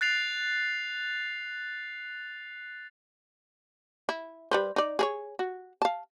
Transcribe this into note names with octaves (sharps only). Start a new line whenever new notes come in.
F#6 A6 C7 F7
E4
G3 B4 C5
D#4 D5
G#4 A4 C#5
F#4
F5 A5